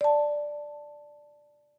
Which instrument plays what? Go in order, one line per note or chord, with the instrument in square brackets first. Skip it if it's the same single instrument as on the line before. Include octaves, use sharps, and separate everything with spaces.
[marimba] D5 A5